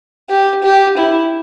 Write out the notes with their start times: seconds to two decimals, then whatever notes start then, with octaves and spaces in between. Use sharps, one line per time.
0.29 G4
0.63 G4
0.97 E4